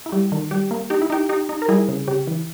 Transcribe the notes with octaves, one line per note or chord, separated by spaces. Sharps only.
E4
G3 G4
D#3
G3 G4
A#3
D#4 G4
E4
D#4 G4
D#4 G4
D#4
A#4
G3 E4 G#4
C#3
C#3 G4
E3